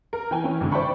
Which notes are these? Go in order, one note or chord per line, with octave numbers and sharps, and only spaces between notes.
A#4
E3 G5 G#5
E3 C#4
G#1 D3
C5 D5 E5 G5 B5 C#6